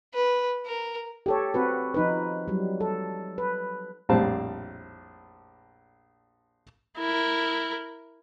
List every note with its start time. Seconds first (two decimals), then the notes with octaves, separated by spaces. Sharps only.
0.14 B4
0.66 A#4
1.26 G4 A4 C#5
1.54 C4 F#4 B4
1.94 F3 D#4 B4
2.48 F#3 G3
2.81 A4
3.38 B4
4.09 A#1 F2 A2 G3 C4 A5
6.98 E4 A#4